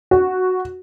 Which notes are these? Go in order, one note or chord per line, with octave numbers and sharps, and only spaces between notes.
F#4